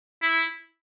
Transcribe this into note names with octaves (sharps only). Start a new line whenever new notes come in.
E4